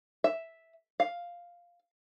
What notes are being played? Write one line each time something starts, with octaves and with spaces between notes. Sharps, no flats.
E5
F5